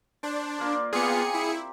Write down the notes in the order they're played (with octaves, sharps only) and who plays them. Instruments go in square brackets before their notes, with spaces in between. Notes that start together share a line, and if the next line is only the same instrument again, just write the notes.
[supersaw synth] D4 [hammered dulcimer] C5
[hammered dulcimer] A#3 F4 D5
[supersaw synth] B3 F4 [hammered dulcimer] C4 G4 [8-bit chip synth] G#4 C#7
[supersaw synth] E4